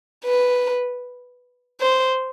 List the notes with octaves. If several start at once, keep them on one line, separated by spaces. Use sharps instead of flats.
B4
C5